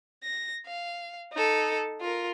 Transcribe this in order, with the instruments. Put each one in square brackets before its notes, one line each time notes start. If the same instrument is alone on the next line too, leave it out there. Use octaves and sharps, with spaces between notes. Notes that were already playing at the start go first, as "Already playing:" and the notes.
[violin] A#6
F5
D#4 A4
F4 A#4